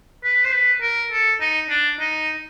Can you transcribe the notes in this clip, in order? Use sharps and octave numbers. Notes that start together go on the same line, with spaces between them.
B4
C5
B4
A#4
A4
D#4
D4
D#4